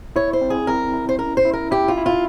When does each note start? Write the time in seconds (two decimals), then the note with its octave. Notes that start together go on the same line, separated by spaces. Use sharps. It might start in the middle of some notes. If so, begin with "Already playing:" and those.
0.16 E4 C#5
0.33 C5
0.41 C4
0.50 G#4
0.67 C4 A#4
0.93 E4
1.09 C5
1.19 C#4 A#4
1.37 C5
1.45 E4
1.53 A#4
1.71 E4 G4
1.88 F4
1.98 E4
2.06 F4